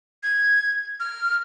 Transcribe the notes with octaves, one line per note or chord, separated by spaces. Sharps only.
G#6
F6